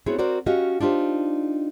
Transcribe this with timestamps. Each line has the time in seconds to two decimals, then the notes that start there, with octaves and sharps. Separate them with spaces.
0.06 B3 C4 E4 F#4 G#4 C#5
0.19 C4 F#4 A#4 C5 D5
0.46 C#4 F#4 G4 D#5 F5
0.81 D4 D#4 F4 G4 C5